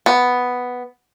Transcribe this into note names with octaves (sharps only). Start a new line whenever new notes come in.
B3